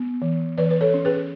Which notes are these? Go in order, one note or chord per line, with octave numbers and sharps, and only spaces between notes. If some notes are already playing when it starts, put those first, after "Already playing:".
Already playing: B3
E3
E3 B4 D5
B4
A4 C#5
C#4
G#4 B4